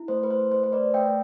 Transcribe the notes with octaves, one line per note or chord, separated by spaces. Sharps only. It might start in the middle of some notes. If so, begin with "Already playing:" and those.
Already playing: E4
A3 C5
B4
C5
A3 C5
C5
B4 D5
A3 E5 G5